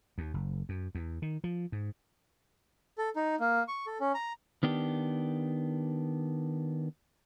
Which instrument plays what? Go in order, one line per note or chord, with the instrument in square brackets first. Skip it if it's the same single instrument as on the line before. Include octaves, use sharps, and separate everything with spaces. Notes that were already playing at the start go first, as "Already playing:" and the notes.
[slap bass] D#2
F#1
F#2
E2
D#3
F3
G#2
[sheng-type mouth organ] A4
D#4
A#3
C#6
A4
C#4
A#5
[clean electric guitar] D#3 B3 D4 G4